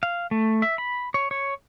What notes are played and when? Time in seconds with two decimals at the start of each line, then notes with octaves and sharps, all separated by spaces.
0.03 F5
0.31 A3
0.62 E5
0.78 B5
1.14 C#5
1.31 C#5